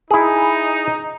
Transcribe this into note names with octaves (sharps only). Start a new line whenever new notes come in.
D#4 E4 G#4